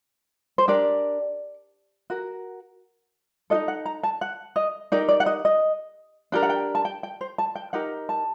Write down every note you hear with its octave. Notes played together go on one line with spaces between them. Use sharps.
C5
D4 G4 A#4 D5
F#4 A#4
D#4 F#4 A4 D#5
F#5
A#5
A5
F#5
D#5
D#4 G4 A#4 D5
D5
F#5
D#5
D#5
D4 G4 A#4
F#5
G5
A5
G5
G5
C5
A5
G5
D#4 G4 A#4 F#5
A5